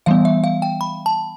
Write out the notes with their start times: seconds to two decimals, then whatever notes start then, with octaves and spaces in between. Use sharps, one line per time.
0.06 E3 G3 B3 F5
0.25 E5
0.44 F5
0.62 G5
0.81 B5
1.06 A5